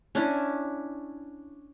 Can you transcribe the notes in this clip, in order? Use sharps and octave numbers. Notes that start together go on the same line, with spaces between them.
C#4 D4 E4